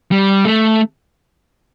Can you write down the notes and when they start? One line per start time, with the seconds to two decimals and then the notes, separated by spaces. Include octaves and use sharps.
0.11 G3
0.45 A3